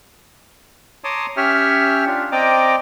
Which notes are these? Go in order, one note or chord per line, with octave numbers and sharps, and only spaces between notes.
C#5 A5 A#5 C6 D6 D#6
C#4 G4 C#5 E5 F6
D4 F4
C4 D5 D#5 G5 A#5 D6